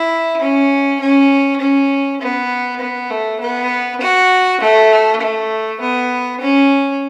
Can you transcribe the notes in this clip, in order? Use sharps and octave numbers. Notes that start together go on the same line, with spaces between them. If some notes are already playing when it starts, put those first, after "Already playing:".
Already playing: E4
C#4
C#4
C#4
B3
B3
A3
B3
F#4
A3
A3
B3
C#4